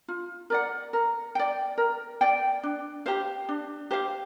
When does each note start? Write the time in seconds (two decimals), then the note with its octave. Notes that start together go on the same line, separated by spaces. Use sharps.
0.08 F4
0.50 A#4 D5 F#5
0.93 A#4
1.35 D5 G5
1.78 A#4
2.21 D5 G5
2.63 D4
3.06 G4 C5 F5
3.49 D4
3.91 G4 C5 F5